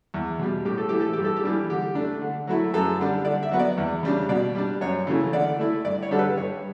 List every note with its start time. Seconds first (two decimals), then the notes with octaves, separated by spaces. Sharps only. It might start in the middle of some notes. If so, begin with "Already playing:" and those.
0.14 E2
0.39 B2 G3
0.65 A2 G4
0.78 A4
0.89 E3 A3 G4
1.01 A4
1.13 G2 G4
1.24 A4
1.36 G4
1.43 E3 G3 D4
1.70 D3 G4
1.95 A3 D4
2.22 D3
2.47 F#3 A3 E4
2.74 F#2 A4
2.99 D3 G3 D4
3.25 D3 D5
3.43 E5
3.51 F#3 B3
3.59 D5
3.77 E2
4.03 C#3 G3 D4
4.29 B2 D5
4.55 G3 D4
4.81 F#2 C#5
5.07 C#3 E3 A3
5.33 D3 D5
5.59 A3 E4
5.85 G2 D5
6.03 C#5
6.11 D3 G3 D4 A4
6.19 B4
6.37 G2 C#5